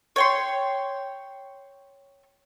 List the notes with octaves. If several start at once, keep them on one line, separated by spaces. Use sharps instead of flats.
C#5 G5 C6